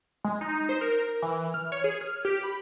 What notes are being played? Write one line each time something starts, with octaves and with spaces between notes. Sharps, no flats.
G#3
D#4
C5
A#4
E3
F6
C#5
G#4
F6
G4
B5